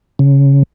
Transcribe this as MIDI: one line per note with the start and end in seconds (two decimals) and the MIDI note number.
0.19 0.63 49